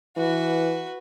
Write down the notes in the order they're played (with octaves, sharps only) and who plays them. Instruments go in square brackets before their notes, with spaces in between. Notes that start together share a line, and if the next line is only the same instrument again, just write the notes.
[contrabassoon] E3 [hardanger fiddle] F#4 B4